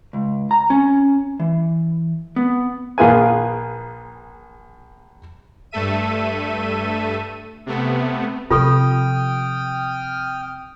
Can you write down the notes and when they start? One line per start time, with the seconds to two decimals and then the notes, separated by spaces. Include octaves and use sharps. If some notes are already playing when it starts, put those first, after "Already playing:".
0.13 C#2
0.51 A#5
0.70 C#4
1.40 E3
2.36 B3
2.98 A#1 A#3 F4 G#4 B4 G#5
5.71 G2 A3 A4 E5 D#7
7.66 C3 A3 B3
8.50 C3 F3 F4 A4 G5 C#6 D#6 F6